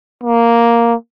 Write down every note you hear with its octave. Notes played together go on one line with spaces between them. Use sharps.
A#3